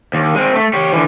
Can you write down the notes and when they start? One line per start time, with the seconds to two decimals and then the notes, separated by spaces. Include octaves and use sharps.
0.14 D#2
0.35 G#3 C4
0.54 A3
0.74 G4 C#5
0.93 D3 E3